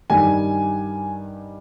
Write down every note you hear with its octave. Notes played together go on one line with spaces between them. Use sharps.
G2 D#3 G3 G#5